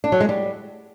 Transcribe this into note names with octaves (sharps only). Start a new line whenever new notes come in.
D4
F#3
G#3
G3